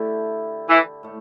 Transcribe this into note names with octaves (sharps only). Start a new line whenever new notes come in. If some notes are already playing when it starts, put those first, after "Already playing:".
Already playing: D3 A3 E4 G4
E3
A2 A3